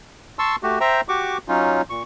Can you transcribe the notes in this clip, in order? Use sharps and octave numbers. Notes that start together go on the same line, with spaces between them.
A5 C6 C#6 E6
A3 F#4 G4
C5 E5 G5 A#5
F#4 G4 C#6 D6
F#3 C#4 D#4 F4
A#2 C#6